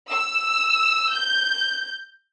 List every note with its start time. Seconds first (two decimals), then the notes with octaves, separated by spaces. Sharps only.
0.10 E6
1.12 G6